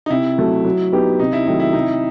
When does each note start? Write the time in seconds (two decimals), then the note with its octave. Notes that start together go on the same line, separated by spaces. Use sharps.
0.06 D#4
0.10 C3 E4
0.38 F#3 A3
0.65 F#3
0.92 B3 D#4 G4 B4
1.19 C3 D#4
1.33 E4
1.46 D#3 F#3 A3 D#4
1.60 E4
1.73 C3 D#4